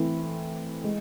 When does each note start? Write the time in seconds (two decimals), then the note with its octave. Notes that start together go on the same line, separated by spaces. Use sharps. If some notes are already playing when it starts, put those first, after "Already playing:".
Already playing: E3 A3 C4 E4
0.84 G#3